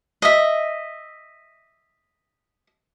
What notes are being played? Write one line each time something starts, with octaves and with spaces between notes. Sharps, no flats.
D#5 E5